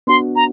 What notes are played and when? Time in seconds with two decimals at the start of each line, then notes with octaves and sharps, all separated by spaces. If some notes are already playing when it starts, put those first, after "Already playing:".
0.07 B3 D4 F#4 C6
0.36 A#5